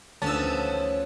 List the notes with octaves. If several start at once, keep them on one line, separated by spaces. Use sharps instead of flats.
D2 D#3 F3 B3 C#4 A5 E6